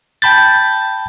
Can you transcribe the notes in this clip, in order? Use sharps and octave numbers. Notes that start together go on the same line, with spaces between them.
G5 A5 B5 G6 A6